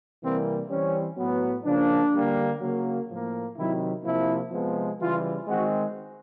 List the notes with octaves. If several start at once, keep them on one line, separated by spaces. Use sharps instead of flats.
C3 E3 G3 A#3 C4
E3 G3 C4 C#4
A2 F#3 B3
C#3 F3 A#3 D4
D3 G3 A#3
C#3 F#3 A#3
A2 F3 A#3
C3 D#3 F#3 E4
C3 F3 A#3 E4
C3 F3 G#3 B3
C#3 E3 G3 F4
D#3 G#3 C4 F#4